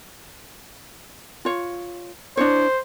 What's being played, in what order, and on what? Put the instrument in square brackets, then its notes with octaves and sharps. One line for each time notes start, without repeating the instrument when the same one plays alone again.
[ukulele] F4 C#5
[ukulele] D4 E4 C#5 [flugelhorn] C5